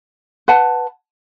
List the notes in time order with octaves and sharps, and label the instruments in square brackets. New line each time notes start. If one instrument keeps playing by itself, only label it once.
[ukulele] B4 F#5 A5